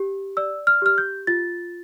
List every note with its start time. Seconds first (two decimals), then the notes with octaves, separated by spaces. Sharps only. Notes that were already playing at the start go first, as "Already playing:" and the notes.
Already playing: G4
0.37 D5 E6
0.67 F6
0.82 G4 F6
0.98 G6
1.27 F4 A6